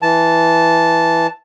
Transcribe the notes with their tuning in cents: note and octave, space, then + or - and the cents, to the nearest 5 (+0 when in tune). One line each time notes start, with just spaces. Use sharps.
E3 +0 A5 -5